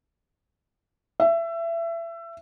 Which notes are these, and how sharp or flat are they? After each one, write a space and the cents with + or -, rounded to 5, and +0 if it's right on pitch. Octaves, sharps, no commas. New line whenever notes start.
E5 +25